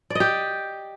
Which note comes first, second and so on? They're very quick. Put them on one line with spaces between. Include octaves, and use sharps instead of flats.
D5 D#5 G4